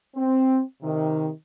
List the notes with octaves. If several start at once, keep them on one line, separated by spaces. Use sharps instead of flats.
C4
C3 D#3